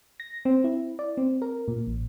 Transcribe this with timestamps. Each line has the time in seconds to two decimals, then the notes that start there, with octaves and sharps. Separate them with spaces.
0.20 A#6
0.45 C4
0.64 E4
0.99 D5
1.17 C4
1.42 A#4
1.68 A#2
1.87 A1